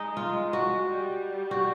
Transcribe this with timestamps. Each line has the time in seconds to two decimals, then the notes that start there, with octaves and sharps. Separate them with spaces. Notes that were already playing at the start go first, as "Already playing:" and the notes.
Already playing: G#3 D#4
0.17 F4
0.53 F#4
0.89 G3
1.51 F#4